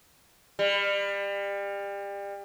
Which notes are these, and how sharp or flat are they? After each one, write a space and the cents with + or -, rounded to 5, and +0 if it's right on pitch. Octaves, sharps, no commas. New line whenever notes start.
G3 +30